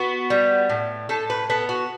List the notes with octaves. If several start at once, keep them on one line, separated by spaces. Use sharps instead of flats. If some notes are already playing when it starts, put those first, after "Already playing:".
Already playing: B3 F#4
G3
A2
A2 A4
B4
B3 A4
F#4